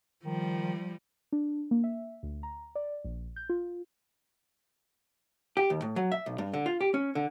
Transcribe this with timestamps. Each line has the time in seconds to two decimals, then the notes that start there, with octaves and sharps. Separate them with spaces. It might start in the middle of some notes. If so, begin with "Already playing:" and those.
0.24 D#3 F3 G3
1.32 D4
1.71 A#3
1.84 E5
2.23 D2
2.43 A#5
2.75 D5
3.05 A#1
3.36 G6
3.49 F4
5.57 G4
5.70 D#2
5.82 A2
5.96 F#3
6.12 E5
6.26 B1
6.38 G2
6.54 D3
6.66 F4
6.81 G4
6.94 C#4
7.15 D3